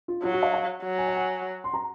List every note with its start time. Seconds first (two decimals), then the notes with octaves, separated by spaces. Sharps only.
0.08 F4
0.23 F#3 F4
0.33 F#4
0.43 F5
0.54 F5
0.83 F#3
0.98 G#5
1.08 F#5
1.17 G#5
1.64 C6
1.74 A#5